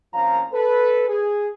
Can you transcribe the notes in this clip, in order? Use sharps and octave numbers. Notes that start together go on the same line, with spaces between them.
C2 A#2 F3 C#4 F5 A#5
A4 B4
G#4